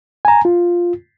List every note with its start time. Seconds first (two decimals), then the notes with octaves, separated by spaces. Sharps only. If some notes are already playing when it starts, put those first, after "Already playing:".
0.25 G#5 A#5
0.45 F4